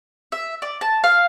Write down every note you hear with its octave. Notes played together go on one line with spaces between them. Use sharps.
E5
D5
A5
F5